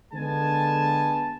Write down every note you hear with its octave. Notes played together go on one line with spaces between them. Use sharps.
D3 G#3 B3 G#5 A5